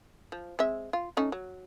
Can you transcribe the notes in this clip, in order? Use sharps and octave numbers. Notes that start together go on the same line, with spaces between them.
F3
G#3 C4 E5
F4
A3 C#4 D#4
F#3